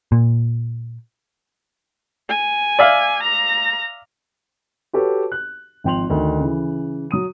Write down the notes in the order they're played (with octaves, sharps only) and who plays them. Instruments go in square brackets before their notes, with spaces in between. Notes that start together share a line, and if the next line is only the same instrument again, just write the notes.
[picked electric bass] A#2
[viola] G#5
[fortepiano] D5 E5 F5
[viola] A#5
[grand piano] F#4 G4 A4 B4 C#5
F#6
G#1 F3 G5 C6 F7 F#7
D2 D#3
C#3 E3
F#3 D#6 D#7